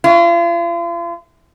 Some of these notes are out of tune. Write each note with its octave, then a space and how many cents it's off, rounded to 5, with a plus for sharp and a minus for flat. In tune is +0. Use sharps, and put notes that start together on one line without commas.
F4 -40